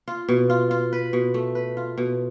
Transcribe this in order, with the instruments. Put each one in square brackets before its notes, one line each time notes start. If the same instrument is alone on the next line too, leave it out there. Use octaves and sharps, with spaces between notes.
[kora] F4
B2
F4
F4
B4
B2
A3
B4
F4
B2